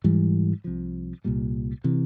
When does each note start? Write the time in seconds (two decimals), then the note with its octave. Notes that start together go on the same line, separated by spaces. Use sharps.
0.04 G#2 E3 G3
0.64 C2 C3 F3
1.24 C2 A#2 G3
1.84 C3 E3